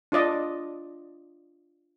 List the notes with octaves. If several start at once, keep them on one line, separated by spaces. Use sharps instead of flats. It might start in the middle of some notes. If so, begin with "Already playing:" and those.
D4 F4 D5 D#5